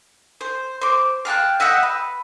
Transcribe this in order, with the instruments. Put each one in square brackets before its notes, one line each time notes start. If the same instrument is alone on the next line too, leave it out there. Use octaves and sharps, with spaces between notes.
[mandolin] C5
C5 D6
F5 G5 A5 F#6
D#5 E5 F#5 G5
B4